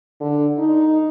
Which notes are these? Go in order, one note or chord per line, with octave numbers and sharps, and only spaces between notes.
D3
D#4